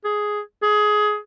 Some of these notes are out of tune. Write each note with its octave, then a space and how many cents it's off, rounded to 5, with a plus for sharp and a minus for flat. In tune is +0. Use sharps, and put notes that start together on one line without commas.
G#4 +5
G#4 +20